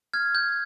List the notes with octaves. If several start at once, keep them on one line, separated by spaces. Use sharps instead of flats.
F6 G#6
G6